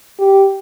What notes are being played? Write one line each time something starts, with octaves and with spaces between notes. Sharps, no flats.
G4